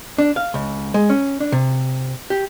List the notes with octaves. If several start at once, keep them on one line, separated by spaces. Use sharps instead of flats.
D4
F5
C#2
G#3
C#4
D4
C3
G4